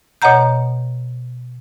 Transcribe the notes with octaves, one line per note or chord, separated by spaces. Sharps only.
B2 C#5 D#5 F#5 A#5 G6